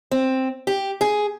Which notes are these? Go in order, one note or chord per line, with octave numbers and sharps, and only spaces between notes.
C4
G4
G#4